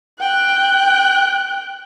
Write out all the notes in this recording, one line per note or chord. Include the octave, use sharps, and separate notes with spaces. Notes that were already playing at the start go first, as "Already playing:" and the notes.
G5 F#6